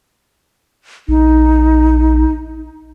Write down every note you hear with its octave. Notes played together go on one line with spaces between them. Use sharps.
A#1 D#4